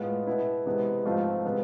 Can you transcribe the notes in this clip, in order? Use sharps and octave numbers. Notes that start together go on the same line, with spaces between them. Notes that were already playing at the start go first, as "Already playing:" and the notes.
Already playing: A2 G#3 B3 F4
B2 B3 E4
C3 E3 G#3 B3
G#2 F3 A3 C4 F4
C3 E3 G#3 B3